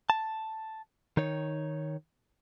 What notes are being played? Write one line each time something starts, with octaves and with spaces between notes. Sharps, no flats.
A5
D#3 D#4 C#5